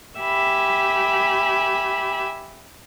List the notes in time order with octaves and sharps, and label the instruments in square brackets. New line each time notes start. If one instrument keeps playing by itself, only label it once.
[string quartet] G4 E5 G#5 B5